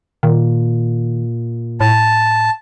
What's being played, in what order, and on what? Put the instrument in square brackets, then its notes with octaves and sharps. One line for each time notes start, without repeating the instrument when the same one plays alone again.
[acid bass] A#2 [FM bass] D#3
[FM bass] A2 [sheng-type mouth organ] A5